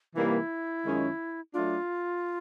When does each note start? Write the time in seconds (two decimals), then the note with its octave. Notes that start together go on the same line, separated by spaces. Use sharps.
0.15 C3 E3 G3 A#3 D#4 E4
0.84 F#2 D#3 G#3 C#4 F4
1.54 F#3 A3 D4 F4